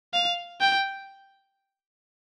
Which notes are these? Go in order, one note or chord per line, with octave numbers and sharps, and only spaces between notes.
F5
G5